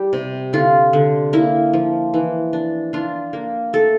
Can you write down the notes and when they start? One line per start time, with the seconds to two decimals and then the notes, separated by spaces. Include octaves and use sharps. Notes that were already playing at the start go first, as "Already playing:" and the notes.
Already playing: G3 G4
0.13 C3
0.53 D3 F4
0.93 D3
1.33 A#3 E4
1.73 F3
2.14 E3
2.53 D4
2.93 D4 F4
3.33 A#3
3.73 A3 A4